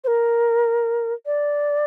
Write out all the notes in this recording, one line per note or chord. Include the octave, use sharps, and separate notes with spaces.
C5
A#4
D5